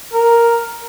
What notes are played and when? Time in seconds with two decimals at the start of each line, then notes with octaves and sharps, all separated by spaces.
0.13 A#4